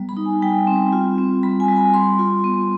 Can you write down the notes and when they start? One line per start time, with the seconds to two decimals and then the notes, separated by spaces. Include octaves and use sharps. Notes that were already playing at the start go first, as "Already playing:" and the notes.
Already playing: G3 B3
0.09 B5
0.17 D#4
0.25 G#5
0.42 G3 G5
0.67 C4
0.93 F4
1.18 C4
1.43 G3 B5
1.60 G#5
1.68 G3
1.77 B5
1.93 G3 C6
2.19 F4
2.44 B3